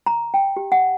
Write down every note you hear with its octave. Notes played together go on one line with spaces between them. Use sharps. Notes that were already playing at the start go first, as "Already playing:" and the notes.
A#5
G5
G4
F#5